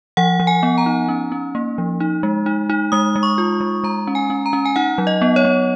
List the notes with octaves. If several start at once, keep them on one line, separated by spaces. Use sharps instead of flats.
F3 F#5
F3
G#5
B3
A#5
D#4
C#4
C#4
A#3
F3
D#4
G#3
D#4
D#4
G#3 D#6
G#3
C#6
F4
G#3
G#3 A#5
C#4
G#5
C#4
A#5
C#4
G#5
D#4 F#5
F#3
D#5
B3
C#5
B3